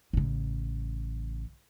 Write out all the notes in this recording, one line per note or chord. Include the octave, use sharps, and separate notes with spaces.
A1 C#3